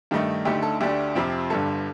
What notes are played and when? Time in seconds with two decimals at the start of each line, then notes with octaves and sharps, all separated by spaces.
0.11 G2 D#3 A3 D#4
0.45 D2 D3 A3 D#4 G4
0.62 A4
0.81 D2 D3 A3 D4 G4
1.15 F2 C3 F3 C4
1.50 G1 G2 D3 A4